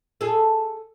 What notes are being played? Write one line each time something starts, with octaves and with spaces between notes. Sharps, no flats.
G#4 A4